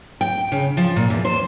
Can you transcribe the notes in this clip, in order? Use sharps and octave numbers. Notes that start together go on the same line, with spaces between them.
G5
C#3
F3
A#2
E2
C5